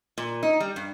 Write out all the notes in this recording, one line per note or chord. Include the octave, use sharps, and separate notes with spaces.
A#2
D#4
G3
G2